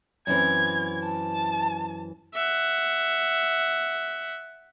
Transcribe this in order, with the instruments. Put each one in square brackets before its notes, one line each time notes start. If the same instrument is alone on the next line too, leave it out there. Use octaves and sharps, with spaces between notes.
[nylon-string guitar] F#2 E3 C4 [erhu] G#6
[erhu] A5
[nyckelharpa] E5 F#5